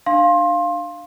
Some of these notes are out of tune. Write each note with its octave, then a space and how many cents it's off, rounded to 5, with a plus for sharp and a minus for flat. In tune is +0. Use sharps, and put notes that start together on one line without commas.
D4 +30 F5 +0 C6 +25